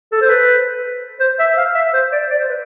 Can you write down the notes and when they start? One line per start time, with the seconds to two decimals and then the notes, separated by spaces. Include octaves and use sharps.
0.12 A4
0.21 C5
0.29 B4
1.20 C5
1.39 E5
1.57 F5
1.74 E5
1.94 C5
2.12 D5
2.30 D5
2.39 C5
2.49 B4